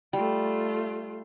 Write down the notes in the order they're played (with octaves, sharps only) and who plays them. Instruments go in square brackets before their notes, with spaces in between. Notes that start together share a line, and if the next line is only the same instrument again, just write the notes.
[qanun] G3 [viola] A3 F4